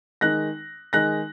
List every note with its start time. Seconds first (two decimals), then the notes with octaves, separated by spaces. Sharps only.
0.21 D#3 G#3 D#4 F#6 A#6
0.93 D#3 G#3 D#4 F#6 A#6